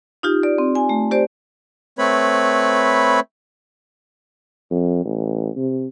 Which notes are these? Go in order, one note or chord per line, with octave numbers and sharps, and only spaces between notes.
D#4 F4 G4
D5
C4
G#5
A3
G4 C5 D5
A3 C4 B4 C#5 B5
F2
A1
C3